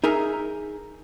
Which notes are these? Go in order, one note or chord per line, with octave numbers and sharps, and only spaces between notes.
D#4 G#4 A#4 E5 G#5 A#5